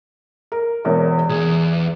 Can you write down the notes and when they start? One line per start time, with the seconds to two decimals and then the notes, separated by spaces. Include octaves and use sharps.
0.52 A#4
0.85 E1 E2 A#4
1.29 B1 E2 G#4